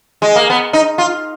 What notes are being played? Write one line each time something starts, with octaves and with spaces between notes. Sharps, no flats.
G#3
A#3
B3
D#4
F4